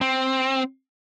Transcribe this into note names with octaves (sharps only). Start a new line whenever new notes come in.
C4